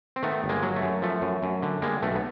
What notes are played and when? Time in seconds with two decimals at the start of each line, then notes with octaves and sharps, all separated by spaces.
0.16 C4
0.23 D#3 A3 B3
0.44 G1
0.49 G#3 A#3
0.62 F#3
0.76 A3
0.82 F#2
1.02 F3 A3
1.22 F#2
1.43 F#2
1.63 D3
1.82 G3 G#3 A#3
2.02 B1 A3
2.15 B3